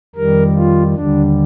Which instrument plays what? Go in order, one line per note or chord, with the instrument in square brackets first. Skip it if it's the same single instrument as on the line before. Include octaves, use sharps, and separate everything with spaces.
[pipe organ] F2 D#3 G3 A#4
F4
D#2 D3 G3 D4